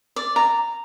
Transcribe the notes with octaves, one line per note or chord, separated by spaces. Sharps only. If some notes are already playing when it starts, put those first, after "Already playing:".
D5
A#5